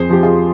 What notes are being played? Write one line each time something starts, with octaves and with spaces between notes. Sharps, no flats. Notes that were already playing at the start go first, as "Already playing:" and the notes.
Already playing: F2 G#4 C5
F3 G4
F4 G#4